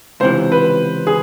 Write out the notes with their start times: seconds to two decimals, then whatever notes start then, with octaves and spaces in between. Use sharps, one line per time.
0.20 C#2 C3 E3 C5
0.52 B4
1.07 G#4